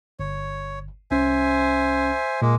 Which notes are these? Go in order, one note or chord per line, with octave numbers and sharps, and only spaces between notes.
G1 C#5
C2 C#4 C5 E5 G#5
A#2 G#3 A#3